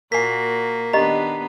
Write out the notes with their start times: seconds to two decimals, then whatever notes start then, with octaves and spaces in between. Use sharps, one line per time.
0.12 A#2 A#3 F#4 A#4 G#5 B6 C7
0.93 D#3 B3 D4 G4 D#5 A#5